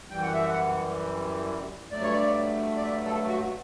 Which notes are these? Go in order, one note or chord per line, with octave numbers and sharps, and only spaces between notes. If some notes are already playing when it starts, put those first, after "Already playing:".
F#2 E3 G3 G5
F#5
E5
F#5
G2 F#3 A3 D5
C#5
D5
D5
E5
A4
F#4